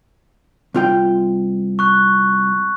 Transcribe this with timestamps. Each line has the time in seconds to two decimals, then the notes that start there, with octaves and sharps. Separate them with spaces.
0.74 C2 F4 G5
1.79 C#6 F#6